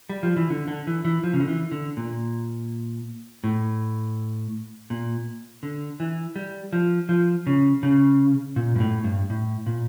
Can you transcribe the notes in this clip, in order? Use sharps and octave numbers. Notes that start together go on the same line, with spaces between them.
G3
F3
E3
D3
D3
E3
E3
F3
C#3
D3
E3
D3
A#2
A2
A#2
D3
E3
G3
F3
F3
C#3
C#3
A#2
G2
A2
G2
A2
A#2